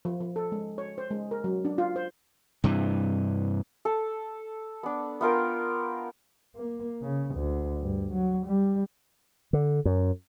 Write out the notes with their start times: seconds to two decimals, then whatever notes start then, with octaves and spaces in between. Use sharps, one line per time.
0.05 F3
0.21 F3
0.36 A4
0.52 G#3
0.78 C#5
0.98 C5
1.11 G#3
1.31 A#4
1.44 F#3
1.65 D4
1.78 F4
1.96 C5
2.64 G2 C3 E3
3.85 A4
4.83 B3 D4
5.21 B3 F4 A#4 G5
6.56 A#3
7.02 C#3
7.34 D2
7.81 G2
8.12 F#3
8.46 G3
9.53 D3
9.85 F#2